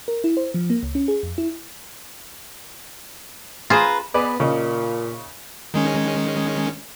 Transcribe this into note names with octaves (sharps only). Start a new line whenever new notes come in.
A#4
E4
C5
F3
A#3
C#2
C#4
G#4
F2
E4
F4 G#4 B4 C5 A#5
B3 G#4 B4 D5
A#2 C#3 D#4
D#3 G#3 C#4